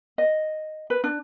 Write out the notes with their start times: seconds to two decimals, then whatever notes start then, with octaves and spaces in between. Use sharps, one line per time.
0.18 D#5
0.90 B4
1.04 D4